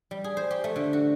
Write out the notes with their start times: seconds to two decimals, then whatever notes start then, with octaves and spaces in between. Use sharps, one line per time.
0.11 G3
0.24 G#4
0.37 C5
0.51 G4
0.64 A3
0.76 D3
0.93 F#4